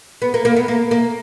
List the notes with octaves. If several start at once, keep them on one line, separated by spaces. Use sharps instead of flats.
B3
A#3
A#3
B3
A#3
A#3